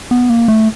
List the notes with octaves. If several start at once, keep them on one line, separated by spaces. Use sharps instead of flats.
B3
A#3
A3